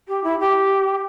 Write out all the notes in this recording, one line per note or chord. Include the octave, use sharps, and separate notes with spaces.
G4
E4
G4